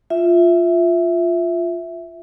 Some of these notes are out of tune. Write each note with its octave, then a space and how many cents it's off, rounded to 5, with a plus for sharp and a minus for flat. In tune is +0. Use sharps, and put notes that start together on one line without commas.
F4 +0 E5 +0